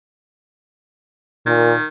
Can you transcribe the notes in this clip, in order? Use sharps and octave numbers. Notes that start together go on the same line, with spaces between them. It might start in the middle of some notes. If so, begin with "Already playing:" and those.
A#2 D#3